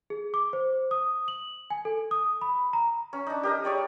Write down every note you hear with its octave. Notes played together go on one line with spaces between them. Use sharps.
G#4
D6
C5
D#6
F#7
G#5
A4
D#6
B5
A#5
C#4
D4 D#4
G4 A#4 D#5
G#4 C#5 D5 G5